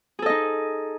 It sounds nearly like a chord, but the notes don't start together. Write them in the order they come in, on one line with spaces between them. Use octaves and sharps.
G#4 A4 D#5 D#4